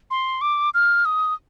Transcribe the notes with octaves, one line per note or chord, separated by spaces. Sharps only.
C6
D6
F6
D#6